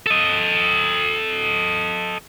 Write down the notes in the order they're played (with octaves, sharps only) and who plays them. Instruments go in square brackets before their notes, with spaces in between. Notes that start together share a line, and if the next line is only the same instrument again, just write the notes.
[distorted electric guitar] A4 D#5